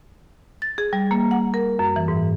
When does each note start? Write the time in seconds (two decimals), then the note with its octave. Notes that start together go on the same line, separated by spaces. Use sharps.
0.62 A6
0.78 G#4
0.93 G3
1.11 A#3
1.31 F#5
1.54 A#4
1.79 F#2
1.96 E3
2.08 G#2